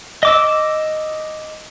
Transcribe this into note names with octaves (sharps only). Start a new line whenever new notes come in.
D#5 D6 E6